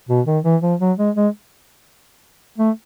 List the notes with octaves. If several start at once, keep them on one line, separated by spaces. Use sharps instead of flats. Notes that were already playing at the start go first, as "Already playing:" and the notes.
B2
D#3
E3
F3
F#3
G#3
G#3
A3